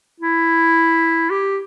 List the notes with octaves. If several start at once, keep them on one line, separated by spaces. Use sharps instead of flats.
E4
G4